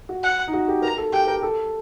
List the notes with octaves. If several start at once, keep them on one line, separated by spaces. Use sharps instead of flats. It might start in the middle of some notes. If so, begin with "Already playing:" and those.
F#4
F#5
D#4
F#4
G4
A#4 A#5
A4
G4 G5
A#4
A4